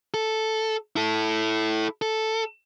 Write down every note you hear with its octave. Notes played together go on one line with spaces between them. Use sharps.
A4
E4 A4
A4